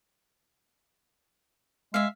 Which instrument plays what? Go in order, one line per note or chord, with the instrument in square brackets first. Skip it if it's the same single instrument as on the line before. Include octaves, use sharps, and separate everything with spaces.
[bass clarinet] G#3 [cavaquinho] E5 F5